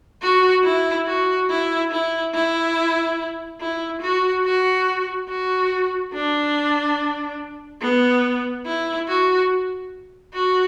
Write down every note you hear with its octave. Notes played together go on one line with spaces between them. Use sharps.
F#4
E4
F#4
E4
E4
E4
E4
F#4
F#4
F#4
D4
B3
E4
F#4
F#4